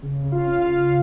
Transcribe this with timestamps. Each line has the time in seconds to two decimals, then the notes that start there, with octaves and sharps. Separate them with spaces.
0.02 C#3
0.24 C#3
0.32 F4 F5
0.46 C#3
0.60 F4 F5
0.68 C#3